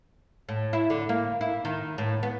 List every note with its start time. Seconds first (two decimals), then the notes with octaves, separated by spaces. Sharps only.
0.49 A2
0.73 E4
0.90 D3
1.09 A#3
1.41 E4
1.65 D#3
1.98 A2
2.23 B3